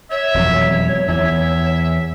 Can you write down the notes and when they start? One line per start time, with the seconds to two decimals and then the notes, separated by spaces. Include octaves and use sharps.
0.11 C#5 E5
0.34 E1 F2 F#3
1.08 E2 E5